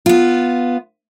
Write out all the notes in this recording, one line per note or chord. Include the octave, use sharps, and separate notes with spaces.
B3 F4